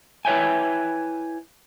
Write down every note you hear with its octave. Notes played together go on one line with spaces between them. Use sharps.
E4 B4 C#5 E5 G5 G#5